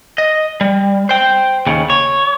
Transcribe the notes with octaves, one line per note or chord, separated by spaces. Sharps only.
D#5
G3
C5 G5
D#2 C#3
C#5